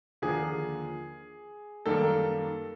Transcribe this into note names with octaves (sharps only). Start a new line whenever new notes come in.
D#2 D3 F3 A#3 G#4
F#2 D#3 G3 A#3 A4